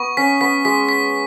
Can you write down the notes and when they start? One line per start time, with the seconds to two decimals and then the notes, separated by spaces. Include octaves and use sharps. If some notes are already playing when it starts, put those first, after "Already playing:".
Already playing: B3 C#6
0.17 C#4 B6
0.41 B3 B6
0.65 G#3 B6
0.89 B6